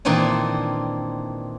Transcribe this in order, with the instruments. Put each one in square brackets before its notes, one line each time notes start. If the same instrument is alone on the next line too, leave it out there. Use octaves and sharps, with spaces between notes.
[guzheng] A#2 D#3 E3 C4 D4 D#4